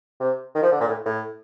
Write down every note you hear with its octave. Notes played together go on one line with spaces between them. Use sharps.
C3
D#3
F3
D3
A#2
A2
A2